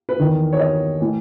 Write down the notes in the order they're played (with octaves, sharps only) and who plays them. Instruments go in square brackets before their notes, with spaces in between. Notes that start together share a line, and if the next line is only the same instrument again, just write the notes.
[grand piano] B4
E2 D#3
C#5
D#5
A2 E3